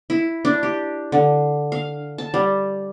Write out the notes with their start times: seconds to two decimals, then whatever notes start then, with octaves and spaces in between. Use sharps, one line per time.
0.10 E4
0.45 D4
0.63 G4
1.12 D3
1.72 F5
2.18 A5
2.34 G3